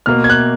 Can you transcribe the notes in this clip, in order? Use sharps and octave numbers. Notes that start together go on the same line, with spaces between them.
B2 A#3 F6
G#6
F#6